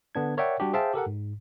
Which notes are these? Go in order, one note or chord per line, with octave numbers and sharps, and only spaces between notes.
D3 B3 D4 G#6
A#4 C#5 D5 E5 F#5 G5
G3 D4 F#4 G4
G#4 C5 E5 F5 G5 A5
G4 A4 A#4 F#5
G#2